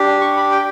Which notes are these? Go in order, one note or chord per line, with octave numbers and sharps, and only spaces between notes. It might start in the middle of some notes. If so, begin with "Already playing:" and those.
Already playing: D4 G4
C#6
B5
G5